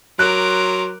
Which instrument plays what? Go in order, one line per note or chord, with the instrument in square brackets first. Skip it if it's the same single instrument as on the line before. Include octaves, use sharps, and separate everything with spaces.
[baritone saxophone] F#3 [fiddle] A#4 D6 [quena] C6 [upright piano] F#6